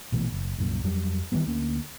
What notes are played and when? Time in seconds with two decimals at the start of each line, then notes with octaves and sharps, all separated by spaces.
0.12 A#1 B2 E3 A3
0.32 F#1
0.58 C2 F#2 A#2
0.84 F2 F#3 G3
1.32 D#3 E3 G3 B3
1.47 D2 A#3 C#4